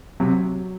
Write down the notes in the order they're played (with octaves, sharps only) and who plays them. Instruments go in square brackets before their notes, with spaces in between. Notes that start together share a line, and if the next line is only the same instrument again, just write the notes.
[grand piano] C3 [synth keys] F#3